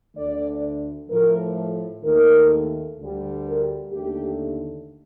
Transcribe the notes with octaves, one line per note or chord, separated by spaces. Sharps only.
D2 D3 A3 D5
A2 F3 A3 A#4
D#2 D#3 A3 A#4
D2 D3 G3
A#4
D#2 D3 A3 G4